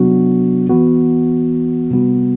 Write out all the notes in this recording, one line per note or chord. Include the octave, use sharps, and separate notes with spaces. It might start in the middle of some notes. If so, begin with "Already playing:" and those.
Already playing: C3 F#3 B3 D4 F#4
E3 B3 F#4
C3 G3 B3 F#4